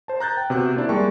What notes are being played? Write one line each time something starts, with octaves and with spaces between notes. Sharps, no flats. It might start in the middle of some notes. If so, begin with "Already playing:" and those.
C5 A5
A#5 F#6 G6 A6
G5
C3 B3 F#4 C5 F#6
A#3 C4 D4 E4
G3 G#3 A#3 A5 C#6